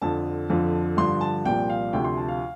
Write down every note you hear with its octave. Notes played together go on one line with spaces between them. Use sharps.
F2 D3 F3 A5
F2 D3 F3
G2 D3 F3 C6
A5
C2 A#2 F3 G5
F5
D2 C3 F3 G5
C6
A5
F5